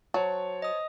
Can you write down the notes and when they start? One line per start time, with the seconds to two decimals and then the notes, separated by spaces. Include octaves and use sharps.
0.14 F#3 C5 C#5 A5
0.62 D#5 D#6